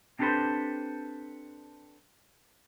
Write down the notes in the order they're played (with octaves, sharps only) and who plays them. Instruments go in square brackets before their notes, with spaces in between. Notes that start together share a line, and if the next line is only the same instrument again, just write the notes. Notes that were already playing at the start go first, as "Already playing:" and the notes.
[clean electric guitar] C4 D4 G4 A4 B4 C5